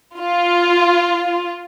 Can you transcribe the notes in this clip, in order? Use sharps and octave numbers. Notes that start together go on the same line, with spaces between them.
F4